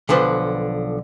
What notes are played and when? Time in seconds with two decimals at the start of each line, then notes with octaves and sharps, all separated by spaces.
0.09 B1 D3 F3 B4 C5